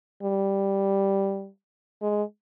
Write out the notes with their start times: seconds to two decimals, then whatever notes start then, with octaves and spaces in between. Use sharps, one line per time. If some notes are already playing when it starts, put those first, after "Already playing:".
0.22 G3
2.02 G#3